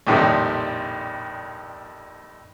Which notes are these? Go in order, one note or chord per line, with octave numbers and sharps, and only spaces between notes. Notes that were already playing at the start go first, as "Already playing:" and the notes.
A#1 F2 A2 C3 D#3 G3